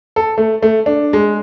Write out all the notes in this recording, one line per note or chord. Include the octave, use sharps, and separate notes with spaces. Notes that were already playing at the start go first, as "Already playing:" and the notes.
A4
A3
A3
D4
G#3